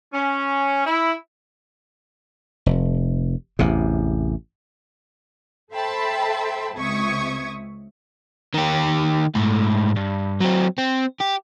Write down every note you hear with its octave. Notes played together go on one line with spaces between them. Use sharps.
C#4
E4
F1
A1 E2 C3
A4 C5 E5 G5 A5 B5
C#2 C4 E5 C#6 D#6 G#6
D#3 G4
G#2 A3
G2
F#3 C4
C4
G4